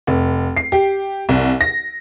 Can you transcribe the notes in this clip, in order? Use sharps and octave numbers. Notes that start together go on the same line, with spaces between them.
F1
C7
G4
C2
A#6